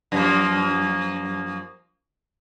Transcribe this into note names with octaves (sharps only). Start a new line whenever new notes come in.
F#2 F3 A#3